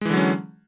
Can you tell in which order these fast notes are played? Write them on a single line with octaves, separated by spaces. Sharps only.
G#3 E3 D3 F#3 C#4